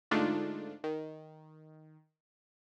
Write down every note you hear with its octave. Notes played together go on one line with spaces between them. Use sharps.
G#2 D3 A3 D4 D#4 F4
D#3